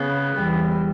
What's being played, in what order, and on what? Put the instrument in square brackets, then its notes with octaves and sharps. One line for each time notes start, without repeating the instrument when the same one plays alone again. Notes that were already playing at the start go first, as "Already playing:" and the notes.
Already playing: [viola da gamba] C#3 [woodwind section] B3
[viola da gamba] E2 E3 [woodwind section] G3